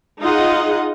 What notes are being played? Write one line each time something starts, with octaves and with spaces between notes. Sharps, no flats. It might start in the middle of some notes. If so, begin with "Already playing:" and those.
D#4 F4 G#4 D#5 F#5